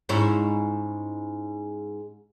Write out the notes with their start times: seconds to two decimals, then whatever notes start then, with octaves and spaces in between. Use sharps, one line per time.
0.09 G#2 C#4 E4